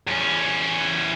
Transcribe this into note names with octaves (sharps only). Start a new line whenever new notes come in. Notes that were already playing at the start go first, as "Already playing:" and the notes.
E2 C#4